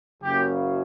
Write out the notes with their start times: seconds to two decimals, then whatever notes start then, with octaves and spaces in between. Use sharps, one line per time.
0.23 F#1 F#2 C#3 G4